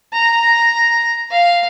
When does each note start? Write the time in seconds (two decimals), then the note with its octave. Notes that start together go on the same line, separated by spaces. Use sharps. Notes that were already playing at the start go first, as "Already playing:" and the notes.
0.13 A#5
1.31 F5